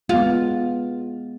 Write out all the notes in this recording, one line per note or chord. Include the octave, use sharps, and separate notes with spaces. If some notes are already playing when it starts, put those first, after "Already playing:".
G#3 B3 F4